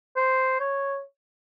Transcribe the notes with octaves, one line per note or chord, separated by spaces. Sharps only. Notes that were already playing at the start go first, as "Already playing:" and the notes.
C5
C#5